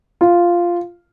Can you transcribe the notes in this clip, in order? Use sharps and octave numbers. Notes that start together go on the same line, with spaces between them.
F4